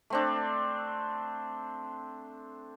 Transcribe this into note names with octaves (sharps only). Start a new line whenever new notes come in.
A3 C4 D4